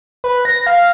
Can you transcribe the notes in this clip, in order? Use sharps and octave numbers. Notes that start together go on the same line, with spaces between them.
B4
A#6
F5